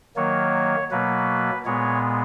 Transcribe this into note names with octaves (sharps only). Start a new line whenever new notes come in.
D#3 F#3 A#3 C#5
B2 F#3 A#3 B4
A#2 G#3 B3 C#5